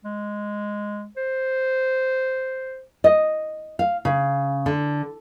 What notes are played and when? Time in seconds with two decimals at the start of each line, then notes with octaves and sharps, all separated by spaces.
0.04 G#3
1.17 C5
3.04 D#5
3.79 F5
4.05 C#3
4.66 D3